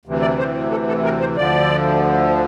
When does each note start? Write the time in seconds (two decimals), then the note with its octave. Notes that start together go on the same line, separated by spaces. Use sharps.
0.06 D2 C3 E3
0.22 D5
0.39 C5
0.71 A4
0.88 A4
1.04 A#4
1.20 C5
1.37 D2 D3 F3 D5